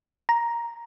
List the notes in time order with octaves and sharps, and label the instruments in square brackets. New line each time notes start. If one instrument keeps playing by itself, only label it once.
[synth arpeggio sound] A#5